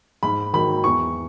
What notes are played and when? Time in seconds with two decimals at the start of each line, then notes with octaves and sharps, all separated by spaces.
0.23 G#2 B5
0.53 D#3 F#3 B5
0.84 E2 C#6